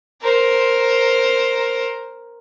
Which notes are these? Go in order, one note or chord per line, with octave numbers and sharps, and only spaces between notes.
A#4 C5